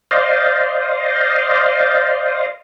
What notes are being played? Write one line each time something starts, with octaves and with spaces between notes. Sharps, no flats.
C5 D5 D#5 F5